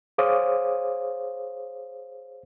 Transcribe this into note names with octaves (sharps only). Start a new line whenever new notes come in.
G#4 C5 C#5 F5 D6 D#6